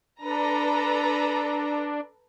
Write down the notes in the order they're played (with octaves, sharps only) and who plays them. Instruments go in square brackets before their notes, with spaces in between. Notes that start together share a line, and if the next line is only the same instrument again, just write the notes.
[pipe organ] D4 [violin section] A4 B4 A#5